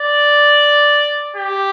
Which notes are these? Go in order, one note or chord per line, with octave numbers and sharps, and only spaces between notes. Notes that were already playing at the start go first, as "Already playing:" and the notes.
Already playing: D5
G4